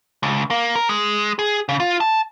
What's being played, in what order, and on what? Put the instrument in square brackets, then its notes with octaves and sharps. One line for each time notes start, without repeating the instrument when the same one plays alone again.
[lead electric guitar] C#2
A#3
A#4
G#3
G#4
C#3
F4
A5